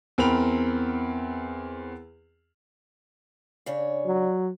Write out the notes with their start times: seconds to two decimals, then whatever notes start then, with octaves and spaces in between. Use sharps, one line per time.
0.18 E2 C4 A#4 G5 B5 F7
3.66 C#3 D4 C#5
4.06 F#3